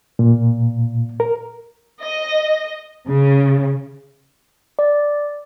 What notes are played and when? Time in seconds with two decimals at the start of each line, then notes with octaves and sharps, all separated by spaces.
0.19 A#2
1.20 A#4
2.01 D#5
3.08 C#3
4.79 D5